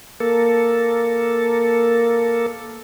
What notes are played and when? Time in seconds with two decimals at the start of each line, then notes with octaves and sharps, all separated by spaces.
0.20 A#3 A4